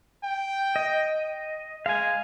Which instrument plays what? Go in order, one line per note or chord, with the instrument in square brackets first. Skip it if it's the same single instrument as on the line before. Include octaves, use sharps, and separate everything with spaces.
[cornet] G5
[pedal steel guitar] D#5
[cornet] G#3 [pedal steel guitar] F5 G#5